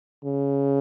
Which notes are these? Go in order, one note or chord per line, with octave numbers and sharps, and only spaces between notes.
C#3